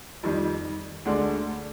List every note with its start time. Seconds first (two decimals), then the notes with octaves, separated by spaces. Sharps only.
0.23 F2 D#3 G3
1.05 D2 D3 G#3 D4